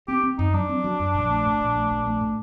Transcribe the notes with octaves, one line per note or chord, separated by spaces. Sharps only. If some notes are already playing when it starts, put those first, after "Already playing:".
C4 G4
C4
F#2 D#4
F#3 D4
C4
F#3
F#2
A#1
A3
A2
A#1
A3
A#1
A3
A2